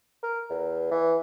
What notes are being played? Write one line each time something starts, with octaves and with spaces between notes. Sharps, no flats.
A#4
E2
E3